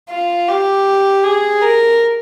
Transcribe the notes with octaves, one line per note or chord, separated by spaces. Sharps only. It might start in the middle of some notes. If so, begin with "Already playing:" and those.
F4
G4
G#4
A#4